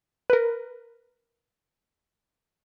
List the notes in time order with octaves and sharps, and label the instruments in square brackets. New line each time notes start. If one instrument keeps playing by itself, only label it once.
[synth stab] A#4 B4